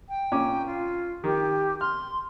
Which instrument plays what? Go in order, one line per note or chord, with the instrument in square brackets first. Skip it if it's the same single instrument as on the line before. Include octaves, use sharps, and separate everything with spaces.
[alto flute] G5
[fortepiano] A#2 C#4 D6
[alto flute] F4
[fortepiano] D#3 [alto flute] G4
[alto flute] C6 [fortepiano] F6